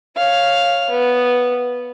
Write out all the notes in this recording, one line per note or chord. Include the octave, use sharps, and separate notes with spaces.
C#5 F5
B3